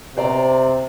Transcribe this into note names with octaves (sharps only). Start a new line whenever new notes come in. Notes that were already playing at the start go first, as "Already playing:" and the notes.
C3 C5 D5 A#5